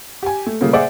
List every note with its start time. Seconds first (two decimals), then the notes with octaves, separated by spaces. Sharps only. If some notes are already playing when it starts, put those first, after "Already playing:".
0.23 G4 G#5
0.46 A3
0.61 A#2 C#3 G3 A3 A#3 F4
0.73 G#4 C5 D5 E5 F#5